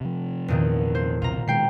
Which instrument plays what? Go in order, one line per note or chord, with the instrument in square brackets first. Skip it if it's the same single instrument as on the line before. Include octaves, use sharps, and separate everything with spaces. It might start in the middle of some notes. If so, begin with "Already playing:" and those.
[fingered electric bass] C3 F3
[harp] E2 A#2 D#3
C5
[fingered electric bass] B1 C3 [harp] F4 A#5
[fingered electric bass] B2 D#3 G#3 [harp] G5 C7